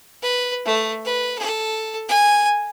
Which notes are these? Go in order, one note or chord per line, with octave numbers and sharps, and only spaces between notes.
B4
A3
B4
A4
G#5